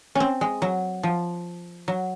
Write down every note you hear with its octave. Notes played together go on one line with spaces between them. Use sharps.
C4 C#4
G#3
F#3
F3
F#3